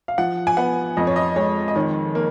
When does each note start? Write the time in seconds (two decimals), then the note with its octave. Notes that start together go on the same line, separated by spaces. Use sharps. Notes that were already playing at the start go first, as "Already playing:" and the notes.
0.08 F5
0.18 F3 F#5
0.47 G#5
0.57 B3 F#5
0.97 F2 D#5
1.07 C#5
1.16 D#5
1.36 G#3 C#5
1.68 D#5
1.76 D#3 C#5
2.15 A#3